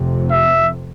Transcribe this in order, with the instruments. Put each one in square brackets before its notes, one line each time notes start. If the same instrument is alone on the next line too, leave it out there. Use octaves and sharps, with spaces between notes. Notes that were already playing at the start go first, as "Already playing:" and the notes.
Already playing: [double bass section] F1 F2 C3
[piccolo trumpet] E5